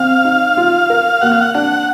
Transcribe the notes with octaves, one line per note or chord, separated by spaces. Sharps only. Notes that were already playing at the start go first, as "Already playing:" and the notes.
Already playing: C4 F5
D#4
F4
A#4
A#3 F#5
F5
F#5
D4 F#5